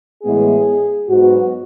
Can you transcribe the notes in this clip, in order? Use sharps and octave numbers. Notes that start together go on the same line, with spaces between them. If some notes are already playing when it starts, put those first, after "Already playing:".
A2 E3 G#3 B3 G#4
G#2 F#3 B3 F#4